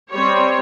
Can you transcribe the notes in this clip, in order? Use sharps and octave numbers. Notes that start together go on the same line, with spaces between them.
G3 C4 C#5